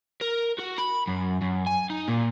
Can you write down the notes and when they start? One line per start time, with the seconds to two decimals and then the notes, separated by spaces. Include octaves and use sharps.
0.22 A#4
0.59 F#4
0.78 B5
1.07 F#2
1.41 F#2
1.67 G#5
1.90 D#4
2.08 A#2